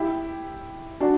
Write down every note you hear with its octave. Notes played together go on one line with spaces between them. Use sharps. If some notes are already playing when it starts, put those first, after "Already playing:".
Already playing: E4 G4
D4 F#4